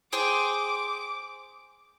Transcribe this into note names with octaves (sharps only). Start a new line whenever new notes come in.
G#4 C5 G5 D6